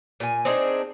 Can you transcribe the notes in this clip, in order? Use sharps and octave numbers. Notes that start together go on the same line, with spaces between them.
A#2 G#5
C4 D4 D#4 G#4